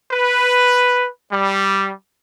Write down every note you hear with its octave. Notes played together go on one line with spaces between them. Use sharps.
B4
G3